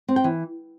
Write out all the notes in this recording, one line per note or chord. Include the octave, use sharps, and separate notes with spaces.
C4
G5
E3